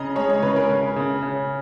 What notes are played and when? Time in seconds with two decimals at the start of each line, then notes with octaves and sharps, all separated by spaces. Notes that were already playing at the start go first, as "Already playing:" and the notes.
Already playing: C#3 D#5 A#5
0.15 G#3 C#5
0.30 C#5
0.42 C#3 B4
0.56 A#4
0.69 C#3
0.96 C#3
1.22 C#3